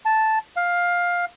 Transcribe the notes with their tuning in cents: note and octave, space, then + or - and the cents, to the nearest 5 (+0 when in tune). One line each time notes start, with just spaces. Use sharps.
A5 -5
F5 +10